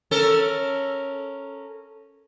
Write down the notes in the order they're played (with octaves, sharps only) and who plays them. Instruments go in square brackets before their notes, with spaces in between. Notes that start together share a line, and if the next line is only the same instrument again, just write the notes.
[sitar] C#4 A4 A#4